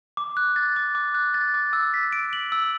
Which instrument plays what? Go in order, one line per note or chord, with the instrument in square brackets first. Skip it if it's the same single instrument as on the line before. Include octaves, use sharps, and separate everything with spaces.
[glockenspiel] D6
F#6
A6
D6
D6
F#6
A6
D6
E6
B6
D7
F#7
E6